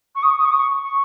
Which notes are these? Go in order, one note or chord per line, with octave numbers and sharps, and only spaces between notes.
C#6
D#6
C#6
D#6
C#6
D#6
C#6
C#6